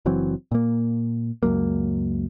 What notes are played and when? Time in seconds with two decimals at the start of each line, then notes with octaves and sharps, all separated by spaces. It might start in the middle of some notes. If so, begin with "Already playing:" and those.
0.06 F#1 E3 F#3 C4
0.52 A#2 A#3
1.43 C#2 F#2 F#3 A#3